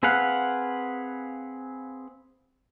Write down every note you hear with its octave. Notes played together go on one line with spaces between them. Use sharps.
C4 G#4 B4 F5 F#5